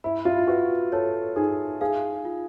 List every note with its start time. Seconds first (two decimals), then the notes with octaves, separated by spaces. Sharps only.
0.04 E4 B5
0.25 F4
0.47 F#4 B4
0.92 A4 C#5
1.36 D#4 G#4
1.81 G#4 F5
2.25 F4